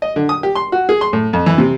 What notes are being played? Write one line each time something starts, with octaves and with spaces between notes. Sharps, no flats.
D#5
D3
D#6
G4
C6
F#4
G#4
C6
A2
F2
E3
C3